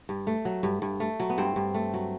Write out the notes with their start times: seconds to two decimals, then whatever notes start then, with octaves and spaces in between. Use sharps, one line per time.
0.09 G2
0.27 A3
0.45 F#3
0.63 G2
0.82 G2
1.00 A3
1.20 F#3
1.30 B3
1.38 G2 C4
1.56 G2
1.75 A3
1.94 F#3